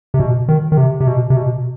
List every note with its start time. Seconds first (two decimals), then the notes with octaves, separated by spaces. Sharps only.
0.14 C3
0.19 B2
0.48 D#3
0.72 D#3
0.77 C3
1.00 C3
1.07 B2
1.30 C3
1.37 B2